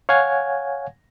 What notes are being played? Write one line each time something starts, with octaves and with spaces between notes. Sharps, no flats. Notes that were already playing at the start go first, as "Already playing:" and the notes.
C#5 F5 F#5 G#5 G#6